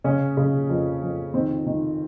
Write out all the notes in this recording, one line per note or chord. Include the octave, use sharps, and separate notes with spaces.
C#3 C#4
C#3
F2
F2
D#3 C4
D#3